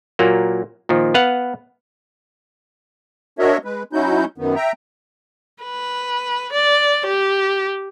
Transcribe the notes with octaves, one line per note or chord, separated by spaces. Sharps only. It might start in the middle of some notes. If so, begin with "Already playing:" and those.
A#2 F#3 A#3
A#2 D#3 F3
B3 B4 F5 F#5
D4 F#4 A#4 C#5 D#5 E5
G#3 B4
F#3 C#4 D#4 E4 F#4 G6
F#2 D#3 B3
E5 G5 A#5
B4
D5
G4